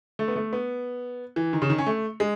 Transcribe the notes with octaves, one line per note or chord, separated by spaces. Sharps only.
A3
B3
A3
B3
E3
D#3
C#3
D#3
C#4
A3
G#3